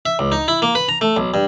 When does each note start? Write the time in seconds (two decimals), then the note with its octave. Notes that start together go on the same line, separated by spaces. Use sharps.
0.06 E5
0.19 C#2
0.32 D#4
0.48 E4
0.62 A#3
0.75 B4
0.89 A#5
1.01 A3
1.17 B1
1.34 G2